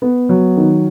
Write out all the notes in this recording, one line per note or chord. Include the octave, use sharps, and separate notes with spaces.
B3
F#3
D#3